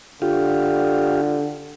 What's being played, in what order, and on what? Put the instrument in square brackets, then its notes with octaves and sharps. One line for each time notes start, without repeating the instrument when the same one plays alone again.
[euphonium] D3 [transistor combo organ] F4 G4